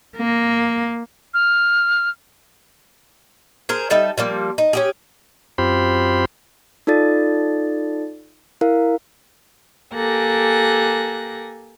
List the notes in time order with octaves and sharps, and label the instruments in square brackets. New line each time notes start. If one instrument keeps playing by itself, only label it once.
[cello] A#3
[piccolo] F6
[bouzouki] G#4 A#4 C5
G3 D#4 A4 E5
F3 G3 A#3
D#4
C#4 G4 G#4
[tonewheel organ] F#2 C4 F4 G4 C5 B5
[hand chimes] D#4 F4 A4 D5 A6
E4 A#4 F5
[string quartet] A#3 G4 A4 G#5 F#6 A#6